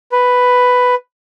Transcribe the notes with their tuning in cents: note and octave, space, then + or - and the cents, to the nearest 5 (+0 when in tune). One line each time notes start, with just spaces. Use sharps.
B4 +5